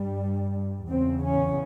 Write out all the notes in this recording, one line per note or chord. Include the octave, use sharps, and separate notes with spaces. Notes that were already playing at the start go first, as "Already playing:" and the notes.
Already playing: G2 G3
E2 C#3 C4
C#4